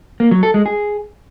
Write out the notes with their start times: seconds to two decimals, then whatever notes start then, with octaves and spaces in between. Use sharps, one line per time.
0.20 A#3
0.31 F#3
0.43 A4
0.54 G#3
0.66 G#4